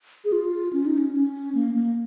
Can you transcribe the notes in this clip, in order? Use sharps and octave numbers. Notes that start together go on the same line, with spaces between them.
G#4
F4
C#4
D#4
C#4
C#4
A#3
A#3